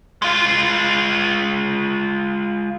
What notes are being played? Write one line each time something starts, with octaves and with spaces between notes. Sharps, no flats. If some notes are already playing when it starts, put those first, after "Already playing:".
G#3 F4